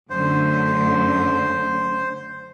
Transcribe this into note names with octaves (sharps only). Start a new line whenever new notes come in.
F#2 D3 A3 C5